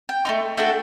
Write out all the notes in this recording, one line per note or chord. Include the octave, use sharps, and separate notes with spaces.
G5
A3 C4 D#4
A3 D4 F#4 A4 G5